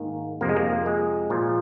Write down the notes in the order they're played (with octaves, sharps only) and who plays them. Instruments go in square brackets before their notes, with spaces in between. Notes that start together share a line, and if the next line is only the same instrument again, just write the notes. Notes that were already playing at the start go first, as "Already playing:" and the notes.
Already playing: [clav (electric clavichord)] G#2 D#3 A#3
F2 C3 F3 A#3
G#3
A#3
G#3
A#2 F3